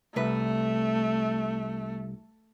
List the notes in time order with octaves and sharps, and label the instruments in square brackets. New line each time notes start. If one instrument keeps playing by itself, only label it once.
[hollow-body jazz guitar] C2 B4 [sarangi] A3